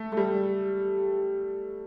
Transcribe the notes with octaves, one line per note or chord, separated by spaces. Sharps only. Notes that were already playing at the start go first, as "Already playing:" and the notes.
Already playing: A3
A3
G3